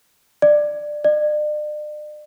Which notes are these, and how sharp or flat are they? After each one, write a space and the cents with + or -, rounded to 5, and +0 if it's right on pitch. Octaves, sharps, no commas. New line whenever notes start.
D5 +15
D5 +40